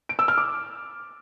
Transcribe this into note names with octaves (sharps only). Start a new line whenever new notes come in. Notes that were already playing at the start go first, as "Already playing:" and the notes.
D7
E6
F6
D6